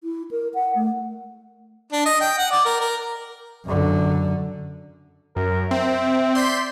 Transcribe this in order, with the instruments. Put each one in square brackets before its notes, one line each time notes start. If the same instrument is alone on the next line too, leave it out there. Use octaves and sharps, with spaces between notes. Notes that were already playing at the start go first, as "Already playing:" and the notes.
[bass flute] E4
A#4
F#5
A3
[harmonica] D4
D#5
G5
F#5
D5
A#4
A#4
[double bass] F#2 D3
[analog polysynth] F#2 [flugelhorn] A#4
[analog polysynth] C4 [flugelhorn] E5
[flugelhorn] D5 [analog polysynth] C6 G6 B6